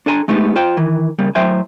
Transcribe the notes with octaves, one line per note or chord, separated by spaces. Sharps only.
D4 A4 G#5 A#5
G#3 A3 B3 D#4 G4
F4 C5 G5
D#3 E3
C#3 G3 A#3
A2 F#3 C5 E5 G5 G#5